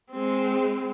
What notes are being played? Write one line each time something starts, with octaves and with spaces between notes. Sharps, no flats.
G#3 C4